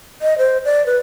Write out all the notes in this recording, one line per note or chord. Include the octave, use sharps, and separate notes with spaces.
D#5
C5
D5
B4